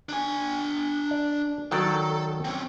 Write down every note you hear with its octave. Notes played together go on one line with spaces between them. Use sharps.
D4 G#5
D5
D#3 F#3 A4 D5
C4 C#4